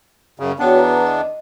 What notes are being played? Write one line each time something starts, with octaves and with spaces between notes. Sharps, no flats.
F#2 C#3
E2 B3 D4 F#4 C#5 G5
B4 A#5
D#5